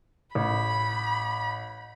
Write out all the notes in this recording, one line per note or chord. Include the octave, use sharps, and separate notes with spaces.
A1 B5